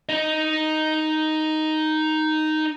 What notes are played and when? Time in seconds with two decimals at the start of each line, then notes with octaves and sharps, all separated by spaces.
0.09 D#4 D#5